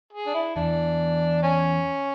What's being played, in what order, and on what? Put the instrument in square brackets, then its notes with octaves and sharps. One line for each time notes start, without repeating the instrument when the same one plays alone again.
[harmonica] G#4
D4
E4
[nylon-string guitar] E2 E3 [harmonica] D4
[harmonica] C#4